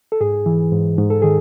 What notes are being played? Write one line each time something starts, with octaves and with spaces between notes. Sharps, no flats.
A4
G#2 G#4
E3
G#2
G#2
A4
D#3 G#4